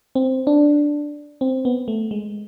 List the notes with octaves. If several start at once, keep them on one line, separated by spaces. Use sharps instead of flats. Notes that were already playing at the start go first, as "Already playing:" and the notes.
C4
D4
C4
B3
A3
G#3